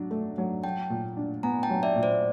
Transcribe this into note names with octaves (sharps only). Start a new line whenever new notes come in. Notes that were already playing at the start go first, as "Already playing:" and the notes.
Already playing: F#3 D4
A3
F#3
F#3 G5 A5
A#2
D4
B3 G#5 A#5
G5 A5
F#3
D5 E5
A#2
C5 D5